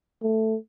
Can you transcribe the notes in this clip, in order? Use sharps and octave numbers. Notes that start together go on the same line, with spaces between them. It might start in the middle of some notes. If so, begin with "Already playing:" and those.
A3